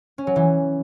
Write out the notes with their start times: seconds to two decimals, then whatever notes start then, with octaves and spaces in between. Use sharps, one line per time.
0.18 C#4
0.27 F#3
0.36 E3